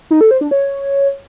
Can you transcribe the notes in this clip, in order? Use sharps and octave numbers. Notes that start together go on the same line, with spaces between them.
D#4
A4
C5
D4
C#5